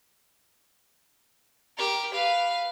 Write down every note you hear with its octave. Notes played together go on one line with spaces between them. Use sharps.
G4 A#4
B4 F5